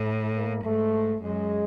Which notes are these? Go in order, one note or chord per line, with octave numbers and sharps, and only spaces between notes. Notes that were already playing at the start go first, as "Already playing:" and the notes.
Already playing: A2 A3
A#3
G#2 A3
F#2 G#3